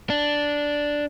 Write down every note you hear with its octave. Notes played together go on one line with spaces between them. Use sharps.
D4